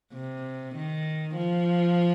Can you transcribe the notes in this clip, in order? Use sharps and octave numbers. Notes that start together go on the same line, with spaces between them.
C3
D#3
F3